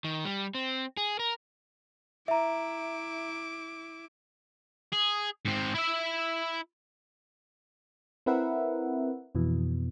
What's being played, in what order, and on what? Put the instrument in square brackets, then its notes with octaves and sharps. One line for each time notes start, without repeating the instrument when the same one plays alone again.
[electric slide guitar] D#3
G3
C4
G#4
A#4
[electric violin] E4 D6 [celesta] E5 A#5
[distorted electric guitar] G#4
G#2 C4
E4 E5
[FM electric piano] C4 E4 A#4 B4 E5 F#5
F2 B2 E3